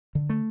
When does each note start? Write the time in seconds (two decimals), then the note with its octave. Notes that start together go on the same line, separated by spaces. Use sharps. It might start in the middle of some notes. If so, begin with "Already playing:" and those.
0.15 D3
0.30 A3